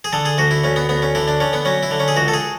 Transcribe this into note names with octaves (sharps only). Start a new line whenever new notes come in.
G#4
D3 A4
G#4
D2 F#4
E4
D2 C#4
B3
D2 B3
C#4
D3 E4
D4
D3 C#4
B3
F#3 C#4
E4
D3
C#4
G#4
C#2 F#4
A4
G#4